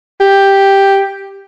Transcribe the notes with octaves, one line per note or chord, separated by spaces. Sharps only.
G4